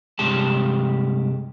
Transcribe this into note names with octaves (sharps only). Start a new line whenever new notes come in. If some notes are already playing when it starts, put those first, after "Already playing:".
G2 C3 G#3 G4 A5